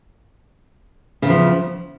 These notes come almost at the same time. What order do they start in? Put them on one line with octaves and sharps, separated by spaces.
C#3 E2 F3